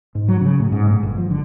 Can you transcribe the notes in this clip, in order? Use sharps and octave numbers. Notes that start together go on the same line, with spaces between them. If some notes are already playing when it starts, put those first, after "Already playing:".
G#2
F#3
C#3
A2
G#2
A2
G1
F3
D3